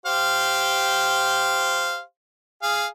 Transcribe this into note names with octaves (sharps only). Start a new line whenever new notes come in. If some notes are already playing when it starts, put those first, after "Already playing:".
G4 C5 F5
G#4 F5